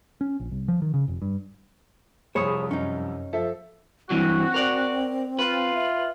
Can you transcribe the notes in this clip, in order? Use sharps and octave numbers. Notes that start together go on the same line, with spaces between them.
C#4
A#1
C2
F3
D#3
C#3
F1
G2
C2 F2 G#4 C5 C#5 B5 D#6
F#2 C#4 D#4
F3 A4 E5
G2 E3 F#3 C4 F#4
A#4 D5
F4 B4
E5